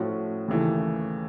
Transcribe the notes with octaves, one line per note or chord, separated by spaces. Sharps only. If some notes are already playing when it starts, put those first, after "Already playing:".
Already playing: A2 F3 A3 C#4 F#4
D#2 C#3 E3 A3